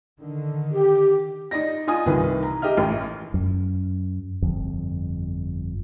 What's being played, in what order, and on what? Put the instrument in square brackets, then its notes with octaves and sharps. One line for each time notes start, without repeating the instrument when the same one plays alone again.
[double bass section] D3 D#3
[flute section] G4
[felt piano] D#4 D5 A#6
F4 D#5 G#5 D#6
C2 D#3 E3 B4
A#5
G4 D#5 E5 F6
A1
[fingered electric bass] F#2
G1 F2